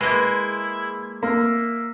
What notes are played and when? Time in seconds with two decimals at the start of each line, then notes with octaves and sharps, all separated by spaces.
0.01 G#3 A#3 E4 B4
1.23 A#3 E5